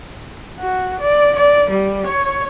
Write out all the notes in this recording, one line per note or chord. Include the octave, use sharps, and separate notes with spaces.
F#4
D5
D5
G3
C#5